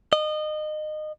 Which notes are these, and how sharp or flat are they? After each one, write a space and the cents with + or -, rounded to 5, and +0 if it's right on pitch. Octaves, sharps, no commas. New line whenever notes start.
D#5 -25